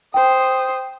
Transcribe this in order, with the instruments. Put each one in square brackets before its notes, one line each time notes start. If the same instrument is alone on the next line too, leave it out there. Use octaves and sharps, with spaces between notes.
[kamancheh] C5 D#6 [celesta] G5